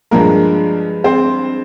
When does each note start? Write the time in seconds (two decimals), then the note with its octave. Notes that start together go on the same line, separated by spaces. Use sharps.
0.11 G2 F3 G#3 A#3 A#4
1.04 C4 C5